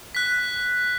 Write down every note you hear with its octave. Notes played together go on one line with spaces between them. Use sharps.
F#6 B6